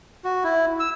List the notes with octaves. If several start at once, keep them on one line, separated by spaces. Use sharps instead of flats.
F#4
E4
E6